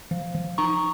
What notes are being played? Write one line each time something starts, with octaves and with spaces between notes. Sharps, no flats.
F3
F3
D#4 A#5 C#6